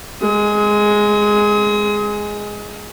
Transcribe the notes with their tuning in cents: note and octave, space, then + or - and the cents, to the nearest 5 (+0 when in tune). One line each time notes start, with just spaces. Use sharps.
G#3 +0 D#6 +35